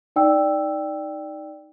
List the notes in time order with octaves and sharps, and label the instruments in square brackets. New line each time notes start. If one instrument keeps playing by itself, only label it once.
[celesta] D#4 D5 G5 E6